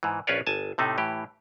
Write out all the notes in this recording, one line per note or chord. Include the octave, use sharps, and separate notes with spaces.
G#2 E3
A#1 C#4 F4 B4 C#5 D5
G1 G#5 A5
A2 C3 A3 D#4
A2 E3 G4